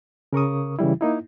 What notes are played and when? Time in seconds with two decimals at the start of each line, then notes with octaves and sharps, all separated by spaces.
0.33 C#3 A#4 C#6 D#6
0.79 C#3 E3 G3 E4
1.01 A#3 D#4 E4